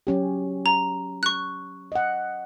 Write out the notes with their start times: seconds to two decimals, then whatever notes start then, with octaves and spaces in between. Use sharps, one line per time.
0.07 F#3 C#4 G4
0.66 A#5
1.23 C#6 F#6
1.92 D#5 F#5